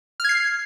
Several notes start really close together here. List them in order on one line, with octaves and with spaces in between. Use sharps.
F6 G#6 C7